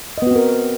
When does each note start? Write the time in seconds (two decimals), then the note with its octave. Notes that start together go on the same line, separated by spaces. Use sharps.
0.18 D#5
0.22 B3
0.27 F#4
0.31 C4
0.36 A#4